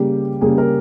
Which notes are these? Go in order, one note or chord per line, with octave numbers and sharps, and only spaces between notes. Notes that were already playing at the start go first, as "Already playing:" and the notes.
Already playing: C#3 G3 A#3 G4
C#3 G3 A#3 G#4
A#4